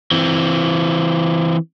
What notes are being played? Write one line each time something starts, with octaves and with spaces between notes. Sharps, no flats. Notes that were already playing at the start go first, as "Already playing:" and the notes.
E3 C4